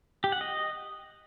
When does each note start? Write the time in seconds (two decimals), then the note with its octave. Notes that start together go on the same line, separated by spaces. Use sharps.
0.24 G4
0.32 F#5
0.41 D#5